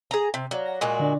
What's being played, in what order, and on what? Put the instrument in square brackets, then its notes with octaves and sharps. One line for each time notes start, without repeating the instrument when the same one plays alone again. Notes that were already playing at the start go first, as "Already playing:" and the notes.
[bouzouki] G#4 A#5
C3
[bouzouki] F#3 [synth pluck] D5 F5 A#5
[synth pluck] F#5 A#6
[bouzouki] A#2 G#3 F#4
[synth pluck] D3 D4 D5